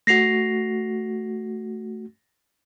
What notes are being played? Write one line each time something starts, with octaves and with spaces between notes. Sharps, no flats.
A3 F#4 A#6 C7 F7